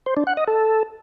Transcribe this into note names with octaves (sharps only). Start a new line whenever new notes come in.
C5
D4
F#5
D#5
A4